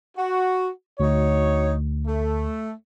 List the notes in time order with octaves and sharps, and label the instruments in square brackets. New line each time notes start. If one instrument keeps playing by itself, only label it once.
[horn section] F#4
[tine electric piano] D2 [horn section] D#4 F#4 C#5
[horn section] A3